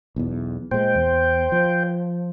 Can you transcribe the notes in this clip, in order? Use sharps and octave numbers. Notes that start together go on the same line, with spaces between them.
B1 E2
A#2 G#3 C5 G5
E2
F3